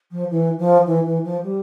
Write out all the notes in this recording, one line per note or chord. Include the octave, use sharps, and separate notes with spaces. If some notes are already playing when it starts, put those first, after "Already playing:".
F3
E3
F3
E3
E3
F3
G3